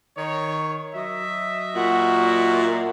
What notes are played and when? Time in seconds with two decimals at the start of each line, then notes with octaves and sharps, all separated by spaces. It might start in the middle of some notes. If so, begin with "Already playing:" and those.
0.17 D#3 C#5
0.95 F#3 D#5 E5
1.75 A#2 F#4